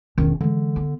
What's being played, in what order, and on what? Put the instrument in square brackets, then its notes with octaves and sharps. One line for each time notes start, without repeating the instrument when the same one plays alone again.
[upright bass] E1 C#4 [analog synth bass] D#3
[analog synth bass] D3 [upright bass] E3 G#3
[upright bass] B3